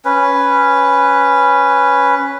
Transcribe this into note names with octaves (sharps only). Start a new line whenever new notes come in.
C#4 B4